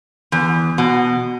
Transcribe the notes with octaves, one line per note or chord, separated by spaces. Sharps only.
E2
B2